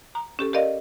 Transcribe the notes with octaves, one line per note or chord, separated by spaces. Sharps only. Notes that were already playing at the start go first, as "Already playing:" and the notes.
A#5
C#4 G4 A4
G4 A#4 D5 D#5 F5